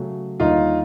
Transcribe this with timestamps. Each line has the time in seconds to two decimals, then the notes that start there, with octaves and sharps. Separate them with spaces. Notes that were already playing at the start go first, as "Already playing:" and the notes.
Already playing: C#3 F#3 A3
0.40 D#2 D3 G3 D#4 F4